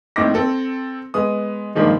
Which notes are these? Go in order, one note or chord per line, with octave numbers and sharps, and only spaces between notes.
A#1 A2 C4 D#4 D6 A#6
C4 A4
G#3 B3 D#6
G2 A#2 D3 D#3 F3 G#3